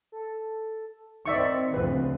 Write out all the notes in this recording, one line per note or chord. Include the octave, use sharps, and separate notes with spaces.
A4
D#3 C4 D#4 D5 E5 C#6
D2 C#3 F3 C4 B4